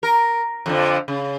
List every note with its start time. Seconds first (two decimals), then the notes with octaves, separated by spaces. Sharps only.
0.03 A#4
0.66 F2 D3 F3
1.08 C#3